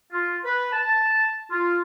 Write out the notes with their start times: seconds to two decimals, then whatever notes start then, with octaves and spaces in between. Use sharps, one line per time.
0.12 F4
0.45 B4
0.73 A5
1.51 F4